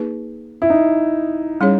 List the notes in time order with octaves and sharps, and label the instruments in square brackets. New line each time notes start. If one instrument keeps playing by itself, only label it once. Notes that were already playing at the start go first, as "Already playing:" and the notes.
Already playing: [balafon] A#3 D#4 G#4 B4
[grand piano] E4
D#4
[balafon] G3 C#4 G#4 C#5